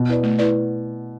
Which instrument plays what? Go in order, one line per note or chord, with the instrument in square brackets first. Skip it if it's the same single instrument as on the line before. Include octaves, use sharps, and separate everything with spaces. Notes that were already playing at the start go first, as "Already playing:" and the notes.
Already playing: [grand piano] B2
[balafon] E4 B4 D5
A3
E4 B4 D5